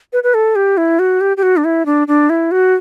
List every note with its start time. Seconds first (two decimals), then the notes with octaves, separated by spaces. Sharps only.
0.13 B4
0.23 B4
0.34 A4
0.56 G4
0.77 E4
0.99 F#4
1.21 G4
1.37 G4
1.43 F#4
1.57 D4
1.64 E4
1.86 D4
2.08 D4
2.30 E4
2.51 F#4